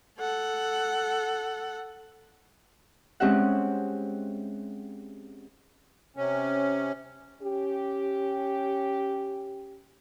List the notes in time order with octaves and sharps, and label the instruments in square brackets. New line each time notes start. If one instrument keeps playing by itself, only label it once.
[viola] A4 F#5
[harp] G#3 C4 C#4 G4 E5 F#5
[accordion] C3 C#4
[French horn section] C#4 G4